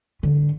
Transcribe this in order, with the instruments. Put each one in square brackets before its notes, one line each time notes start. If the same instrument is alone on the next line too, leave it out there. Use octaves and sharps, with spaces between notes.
[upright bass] D3